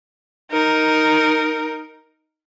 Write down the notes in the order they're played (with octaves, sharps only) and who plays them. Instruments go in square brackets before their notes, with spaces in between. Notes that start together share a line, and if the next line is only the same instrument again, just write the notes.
[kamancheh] D#4 A#4